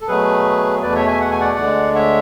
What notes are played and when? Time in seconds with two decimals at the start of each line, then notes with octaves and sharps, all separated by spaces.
0.01 A4
0.08 B2 F#3 A3 G#4 B4
0.82 E2 B2 A3 B4 D5
0.95 C#5 E5
1.07 E5 G#5
1.20 F#5
1.31 G#5
1.40 D5 F#5
1.58 D2 D3 G#3
1.95 C#5 E5